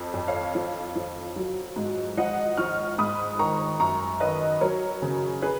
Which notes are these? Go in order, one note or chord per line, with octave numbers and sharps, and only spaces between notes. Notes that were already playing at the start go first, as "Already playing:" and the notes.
Already playing: F2
F2
C#5 F5
F3
F3
F#3
G#2
F3 D#5 F#5
F3 C#6 F6
G#2 B5 D#6
D#3 A#5 C#6
F#2 A#5 C#6
D#3 B4 D#5
F#3 A#4 C#5
C#3
G#4 B4